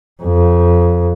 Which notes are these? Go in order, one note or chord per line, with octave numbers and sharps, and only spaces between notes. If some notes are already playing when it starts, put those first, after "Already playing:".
F2